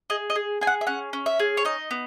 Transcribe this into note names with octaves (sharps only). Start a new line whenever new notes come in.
G#4 D#5
D#5
G#4
G#4 G#5
F#5
E5
C#4 F#5
C#4
E5
G#4
C#5
D#4 D#5
B3